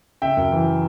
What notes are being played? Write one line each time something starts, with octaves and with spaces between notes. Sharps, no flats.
C#3 E5 G5
F#2
E3